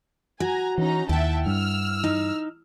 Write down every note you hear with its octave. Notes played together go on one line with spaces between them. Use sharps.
F#4 G#5 A#5
E3 C#4 D#4 A#5
D#2 E4 E5 F#5 G5 A5
G2 E6 F6
D#4